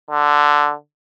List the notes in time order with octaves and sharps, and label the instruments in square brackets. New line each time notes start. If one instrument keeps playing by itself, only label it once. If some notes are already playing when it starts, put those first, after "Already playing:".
[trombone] D3